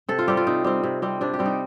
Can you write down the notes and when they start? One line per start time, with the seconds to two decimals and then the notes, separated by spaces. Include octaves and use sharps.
0.09 C3 A4
0.19 F4
0.28 G3 C4 G4
0.37 F4
0.47 C3 D#4
0.64 G3 C4
0.84 C3
1.02 G3 C4
1.21 C3 D4
1.34 G4
1.39 G3 C4
1.46 D#4